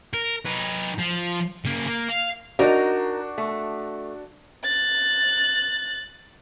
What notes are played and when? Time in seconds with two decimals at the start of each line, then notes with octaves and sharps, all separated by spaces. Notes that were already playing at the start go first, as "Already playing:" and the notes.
0.14 A#4
0.46 D#4 B4
0.99 F3
1.65 C#3 A#3
1.87 A#3
2.09 F5
2.59 D4 D#4 F#4 A#4 D5
3.38 A3
4.64 F#6 A6